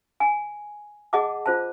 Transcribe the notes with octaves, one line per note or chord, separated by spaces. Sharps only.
G#5
G#4 D#5 F#5 A5 D6
F4 C5 A5